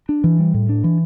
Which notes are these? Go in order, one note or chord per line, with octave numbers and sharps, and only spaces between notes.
D4
E3
G3
A2
D4
E3